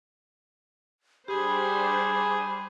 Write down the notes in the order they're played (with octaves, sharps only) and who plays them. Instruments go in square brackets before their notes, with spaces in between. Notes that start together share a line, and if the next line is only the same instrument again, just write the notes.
[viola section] G3 D4 C5 [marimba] G4 [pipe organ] G#4 [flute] B5